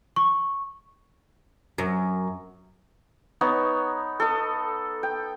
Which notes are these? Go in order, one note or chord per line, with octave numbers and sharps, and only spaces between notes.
C#6
F#2
B3 D#4 C#5
A4 D#5
G5